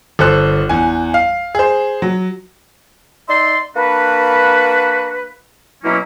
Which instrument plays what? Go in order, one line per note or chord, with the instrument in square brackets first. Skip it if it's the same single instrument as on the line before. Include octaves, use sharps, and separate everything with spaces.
[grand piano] G1 A4 C5 F#6
E2 G#5
F5
G#4 C5
F#3
[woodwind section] D#4 D5 E5 C6
A#3 D4 F#4 B4
B2 F#3 A#3 C#4 E4